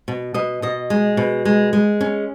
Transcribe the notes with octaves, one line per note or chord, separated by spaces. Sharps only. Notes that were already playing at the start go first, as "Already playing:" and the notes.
B2
B2 D#5
B2 D#5
G#3
B2
G#3
G#3
C#4